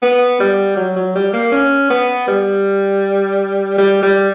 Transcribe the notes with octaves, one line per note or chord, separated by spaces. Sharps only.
B3
G3
F#3
F#3
G3
A#3
C#4
B3
G3
G3
G3